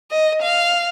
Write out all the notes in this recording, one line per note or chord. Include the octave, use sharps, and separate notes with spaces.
D#5
F5